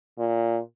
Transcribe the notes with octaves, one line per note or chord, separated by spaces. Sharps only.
A#2